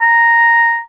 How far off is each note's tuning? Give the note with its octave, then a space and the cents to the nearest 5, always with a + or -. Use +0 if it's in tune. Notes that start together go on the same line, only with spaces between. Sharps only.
A#5 -5